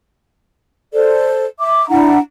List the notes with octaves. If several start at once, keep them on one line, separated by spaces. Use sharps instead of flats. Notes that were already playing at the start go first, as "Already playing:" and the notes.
A4 C5 D5
E5 D6
D4 E4 F#5 A#5